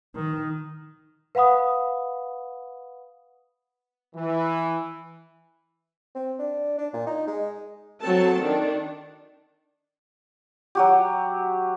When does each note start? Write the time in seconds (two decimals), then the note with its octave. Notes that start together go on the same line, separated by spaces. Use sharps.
0.16 D#3
1.35 B4 F5 F#5 B5 D#6
4.16 E3
6.15 C4
6.39 D4
6.78 D4
6.94 A#2
7.07 D#4
7.27 G#3
8.01 F#3 C4 A4 A5
8.40 D#3 D4
10.75 F#3 F#4 G4